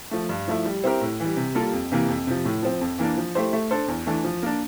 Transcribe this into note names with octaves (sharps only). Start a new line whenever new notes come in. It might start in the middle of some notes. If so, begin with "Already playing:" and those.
F3 A3
G2
F3 A3 E4
G3
C4 E4 G4 A#4
A2
E3 G3
C3
G3 A#3 F4 A4
F2
C3 E3 A#3
F2
C3 F3
A2
F3 C4
F2
E3 A#3 D4
F3
A3 E4 G4 C5
A3
D4 A4 C5
E2
E3 A3 D4
F3
A#3 D4